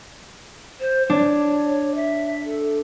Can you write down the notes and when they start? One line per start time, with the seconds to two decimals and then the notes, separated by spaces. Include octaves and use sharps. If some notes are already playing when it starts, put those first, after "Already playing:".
0.80 C5
1.10 D4 C#5
1.95 E5
2.44 A4